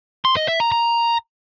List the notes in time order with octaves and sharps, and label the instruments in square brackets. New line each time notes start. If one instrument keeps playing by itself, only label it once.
[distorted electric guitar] C6
D#5
E5
A#5
A#5